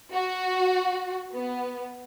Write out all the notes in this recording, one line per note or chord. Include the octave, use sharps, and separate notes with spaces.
F#4
B3